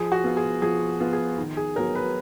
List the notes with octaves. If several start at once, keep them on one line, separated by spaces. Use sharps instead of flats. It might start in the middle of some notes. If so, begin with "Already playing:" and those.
Already playing: F3 G#4
F#4
B3 F4
G#4
F3 G#4
B3 F4
G#4
D#3
G#4
F#3 B3 F#4 A#4 C#5
B4